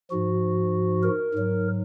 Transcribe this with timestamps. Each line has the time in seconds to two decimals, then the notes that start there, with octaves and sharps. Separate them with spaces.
0.11 G#2 F3 F#4
1.03 A#4
1.34 G#2 F#3